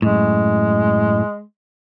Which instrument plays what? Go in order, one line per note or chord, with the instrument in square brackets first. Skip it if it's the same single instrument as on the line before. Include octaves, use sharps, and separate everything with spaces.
[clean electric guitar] F#2 A2 [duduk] G#3